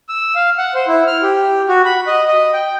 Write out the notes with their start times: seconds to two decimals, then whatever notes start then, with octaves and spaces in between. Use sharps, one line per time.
0.09 E6
0.35 F5
0.58 F#5
0.74 C5
0.88 E4
1.07 F6
1.23 G4
1.69 F#4
1.85 B5
2.07 D#5
2.28 D#5
2.53 G5